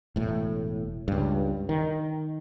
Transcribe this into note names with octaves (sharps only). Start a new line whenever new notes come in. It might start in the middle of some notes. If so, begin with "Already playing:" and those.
E1 A2
C#2 G2
D#3